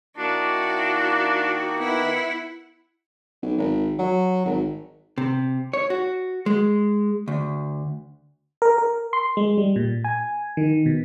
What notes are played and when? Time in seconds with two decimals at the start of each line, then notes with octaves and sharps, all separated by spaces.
0.18 D#3 A#3 D4 E4 F#4
1.79 B3 E4 F#5
3.43 B1
3.58 G#1
3.99 F#3
4.45 G#1
5.18 C3
5.73 C#5
5.90 F#4
6.46 G#3
7.28 D2
8.62 A#4
8.78 A#4
9.13 C6
9.37 G#3
9.58 G3
9.76 A#2
10.04 G#5
10.57 D#3
10.86 B2